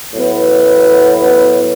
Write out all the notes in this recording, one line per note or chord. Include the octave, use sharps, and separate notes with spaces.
A2 F#3 B3